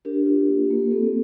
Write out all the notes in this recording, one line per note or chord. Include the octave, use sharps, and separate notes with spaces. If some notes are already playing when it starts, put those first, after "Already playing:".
D4 G4 A#4
F4
A#3
A#3
C4 A4